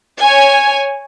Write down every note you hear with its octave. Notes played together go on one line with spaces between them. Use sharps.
C#5 G#5